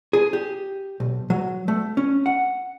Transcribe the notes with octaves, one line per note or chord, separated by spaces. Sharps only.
G#4
G4
B1
F#3
A3
C#4
F#5